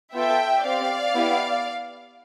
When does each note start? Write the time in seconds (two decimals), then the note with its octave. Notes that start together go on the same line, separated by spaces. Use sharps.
0.14 B3 F4 A4 E5 G5
0.65 C4 G4 D5 F5
1.14 B3 E4 G4